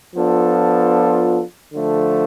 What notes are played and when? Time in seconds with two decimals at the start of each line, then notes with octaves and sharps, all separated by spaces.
0.15 F3 B3 D4 F4 A4
1.74 D3 F3 A3